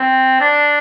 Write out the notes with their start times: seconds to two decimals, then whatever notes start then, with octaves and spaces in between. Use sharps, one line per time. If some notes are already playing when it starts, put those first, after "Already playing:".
Already playing: C4
0.41 D4